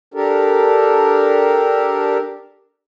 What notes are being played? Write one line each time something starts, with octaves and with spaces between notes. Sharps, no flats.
D4 G4 A4 A#4